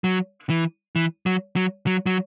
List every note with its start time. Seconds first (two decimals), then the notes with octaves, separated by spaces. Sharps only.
0.04 F#3
0.50 E3
0.96 E3
1.26 F#3
1.56 F#3
1.87 F#3
2.06 F#3